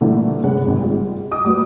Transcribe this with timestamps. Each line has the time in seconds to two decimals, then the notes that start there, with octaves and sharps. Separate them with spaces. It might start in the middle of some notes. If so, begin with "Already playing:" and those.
0.01 A#2 D3 E3 G3 A3 A#3
0.44 G2 C3 G#3 C#4 F#5
0.64 G#1 G#2
0.81 G3 G#3 F4
1.31 D#5 D6 D#6
1.45 G3 A#3 F#4 B4